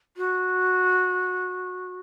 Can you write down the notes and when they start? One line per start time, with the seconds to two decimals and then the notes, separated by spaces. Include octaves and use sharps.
0.17 F#4